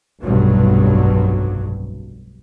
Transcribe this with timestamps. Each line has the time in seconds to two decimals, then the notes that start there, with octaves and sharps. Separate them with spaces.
0.22 F1 B1 G2 F#3